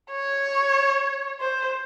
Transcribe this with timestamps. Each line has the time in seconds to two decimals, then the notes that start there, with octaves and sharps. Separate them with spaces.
0.12 C#5
1.40 C5